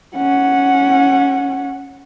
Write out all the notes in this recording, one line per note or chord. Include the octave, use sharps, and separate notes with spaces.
C#4 F#5